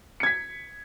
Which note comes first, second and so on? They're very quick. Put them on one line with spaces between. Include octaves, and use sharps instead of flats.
C#7 G#6 B6